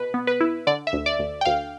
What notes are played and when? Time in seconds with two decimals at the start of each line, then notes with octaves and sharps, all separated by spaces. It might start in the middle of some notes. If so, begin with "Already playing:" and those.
Already playing: B2 B4
0.14 B3
0.27 B4
0.40 E4
0.67 D3 D5
0.87 E5
0.93 D2
1.06 D5
1.19 D2
1.41 G5
1.45 D2 F5